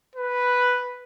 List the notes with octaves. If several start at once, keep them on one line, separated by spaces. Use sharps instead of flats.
B4